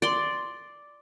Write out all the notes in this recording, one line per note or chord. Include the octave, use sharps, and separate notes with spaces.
D5 C6